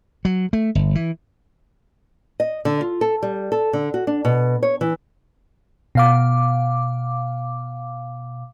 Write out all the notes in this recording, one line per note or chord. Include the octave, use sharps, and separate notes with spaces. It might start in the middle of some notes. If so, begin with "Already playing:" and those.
F#3
A3
G1
E3
D#5
D3
F4
A4
G3
A4
D3
F#4
D4
B2
C#5
E3
B2 F5 D6